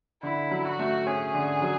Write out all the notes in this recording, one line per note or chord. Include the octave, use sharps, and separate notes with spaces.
D3 E4
F#3
F#4
A3
C#4 G#4
D3
F#3